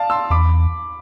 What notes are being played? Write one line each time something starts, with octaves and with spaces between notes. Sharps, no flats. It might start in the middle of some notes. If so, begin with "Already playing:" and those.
Already playing: D5 F5 A5
C6 E6
E2 B5 D6